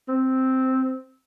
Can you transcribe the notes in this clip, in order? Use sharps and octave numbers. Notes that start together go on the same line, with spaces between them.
C4